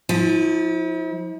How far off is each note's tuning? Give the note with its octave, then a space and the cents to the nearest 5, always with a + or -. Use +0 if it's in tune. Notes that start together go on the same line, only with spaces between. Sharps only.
F3 +15 E4 -40